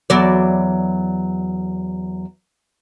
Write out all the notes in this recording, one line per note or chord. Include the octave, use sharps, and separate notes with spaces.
E2 F#3 D5